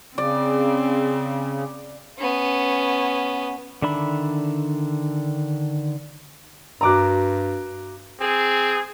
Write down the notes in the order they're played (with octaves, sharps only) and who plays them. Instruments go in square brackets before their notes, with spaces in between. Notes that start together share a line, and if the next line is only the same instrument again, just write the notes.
[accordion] C#3 [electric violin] C4 [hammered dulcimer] D5
[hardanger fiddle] B3 C#4
[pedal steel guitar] D3 D#3 D4 E5 B5
[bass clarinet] G2 [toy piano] F#4 A#4 [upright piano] A#5 D6 F#6
[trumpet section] C4 G#4